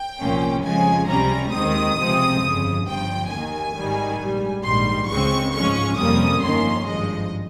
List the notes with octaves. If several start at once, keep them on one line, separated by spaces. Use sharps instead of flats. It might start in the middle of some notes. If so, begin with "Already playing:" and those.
Already playing: G5
C2 A#2 F3 A#3 C#4
F2 C#3 F3 G#3 G#5
C#2 C3 G3 C#4 A#5
D#2 D#3 G#3 C4 D#6
C#2 C3 F3 C4
G1 F2 C#3
G1 G2 F3 G5
D#2 D#3 A#3 G#5
G#1 G#2 D#3 G3
A#1 G#2 G3
A#1 G#2 D#3 G3 C6
C#2 C#3 G#3 C4 C#6
G#2 F3 G#3 C#4 C#6
F2 C3 G3 A#3 C#4 D#6
G1 F2 D#3 A#3 C#4 C6
G#1 G2 F3 G#3 D#5